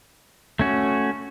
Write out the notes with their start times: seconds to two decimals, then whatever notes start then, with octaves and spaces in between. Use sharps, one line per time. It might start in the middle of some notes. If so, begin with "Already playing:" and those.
0.59 A3 C#4 F#4